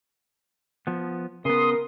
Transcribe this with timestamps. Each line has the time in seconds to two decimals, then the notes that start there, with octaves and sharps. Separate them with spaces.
0.87 F3 B3
1.45 C#3 B3 A#4 C6 D#6